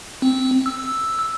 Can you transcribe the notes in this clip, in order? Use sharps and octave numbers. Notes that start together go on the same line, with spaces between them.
C4
E6